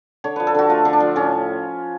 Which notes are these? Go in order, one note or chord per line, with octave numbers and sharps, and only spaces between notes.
D3 C#5
F3 B4
A4
D3 F#4
A3 F4
D3
D4
F3
A2 C#4